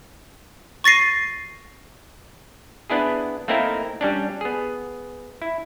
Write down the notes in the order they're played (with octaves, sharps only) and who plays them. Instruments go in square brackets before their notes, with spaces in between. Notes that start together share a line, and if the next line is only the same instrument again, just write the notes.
[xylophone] C#6 A6 A#6 C7 D#7
[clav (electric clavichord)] B3 D4 E4 G#4
A3 A#3 C4 D#4 E4 A#4
G3 C#4 D4
B3 G#4
E4